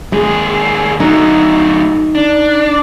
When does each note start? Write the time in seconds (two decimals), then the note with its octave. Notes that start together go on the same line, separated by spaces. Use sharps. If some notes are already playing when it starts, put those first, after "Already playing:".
0.12 D#2 G#3 G#4
1.00 F#3 A3 D#4
2.15 D4